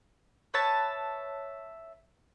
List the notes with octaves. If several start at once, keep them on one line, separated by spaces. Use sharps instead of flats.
B4 C#5 E5 A5